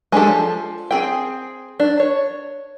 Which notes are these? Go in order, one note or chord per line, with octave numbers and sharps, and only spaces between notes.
G#3 D4 G4 A4
F3
C4 G#4 G5
D4
C#5